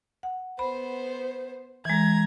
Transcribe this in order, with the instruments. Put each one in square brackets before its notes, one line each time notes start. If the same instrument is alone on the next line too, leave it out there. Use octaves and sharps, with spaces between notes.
[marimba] F#5
[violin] B3 C5 [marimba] B5
[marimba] E3 G#3 [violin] A#5 G#6